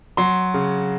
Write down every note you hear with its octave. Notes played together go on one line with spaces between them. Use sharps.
F#3 C6
C#3